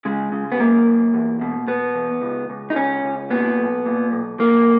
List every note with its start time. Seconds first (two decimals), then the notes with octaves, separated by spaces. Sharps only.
0.05 C#3 G#3
0.32 C#3
0.52 B3
0.60 F#2 A#3
0.87 F#2
1.14 E2
1.41 B2
1.68 B2 B3
1.95 E2
2.22 C#2
2.50 C#2
2.70 D#4
2.76 C#2 C#4
3.04 C#2
3.31 A#2 B3
3.58 B1
3.86 A#2
4.12 B1
4.39 B1 A#3